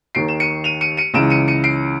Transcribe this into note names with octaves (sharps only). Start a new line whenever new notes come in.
D#2 D#3 C7 D7
E7
C#7 D#7
D#7 F7
C#7 D#7
C#7 D#7
C#2 C#3 E3 D7 E7
C#7 D#7
C#7 D#7
C7 D7